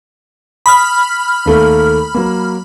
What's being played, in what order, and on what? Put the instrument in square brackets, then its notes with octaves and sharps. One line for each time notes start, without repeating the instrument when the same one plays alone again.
[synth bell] B5 F6 [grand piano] D#6
[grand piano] D#2 A3 A#3
F#3 A#3